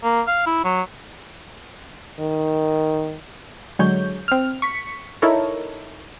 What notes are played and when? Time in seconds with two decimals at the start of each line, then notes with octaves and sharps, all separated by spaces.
0.04 A#3
0.27 F5
0.47 E4
0.65 F#3
2.20 D#3
3.79 D3 F#3 G#3 C#5 G6
4.28 C4 F6
4.62 C#6 B6 C#7
5.22 D#4 E4 A4 A#4 C#5